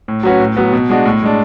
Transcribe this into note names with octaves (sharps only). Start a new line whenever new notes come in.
A2
F#3 C#4 F#4 B4
A2
F#3 B3
B2
G#3 D4 F#4
A2
G#3 D4